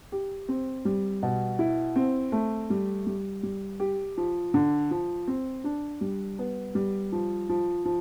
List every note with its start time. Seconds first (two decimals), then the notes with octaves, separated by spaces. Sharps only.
0.12 G4
0.48 C4
0.85 G3
1.22 B2
1.59 E4
1.96 C4
2.32 A3
2.70 G3
3.07 G3
3.43 G3
3.80 G4
4.17 F3
4.54 D3
4.91 F3
5.28 C4
5.64 D4
6.01 G3
6.39 B3
6.75 G3
7.12 F3
7.49 F3
7.85 F3